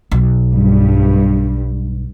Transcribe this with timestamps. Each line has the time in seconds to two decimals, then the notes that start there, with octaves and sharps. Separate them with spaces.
0.11 B1
0.54 G2